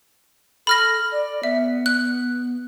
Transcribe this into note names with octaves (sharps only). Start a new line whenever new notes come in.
A4 B5 F6 A#6
D5
B3 E5
F#6